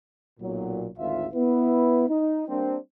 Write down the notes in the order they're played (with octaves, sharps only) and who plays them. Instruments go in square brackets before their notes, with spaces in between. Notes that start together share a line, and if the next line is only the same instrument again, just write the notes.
[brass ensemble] B1 A#2 F#3
G#1 D2 F4 E5
B3 E4 B4
D#4
G3 A#3 C4 D4